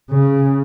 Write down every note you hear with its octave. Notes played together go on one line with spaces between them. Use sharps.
C#3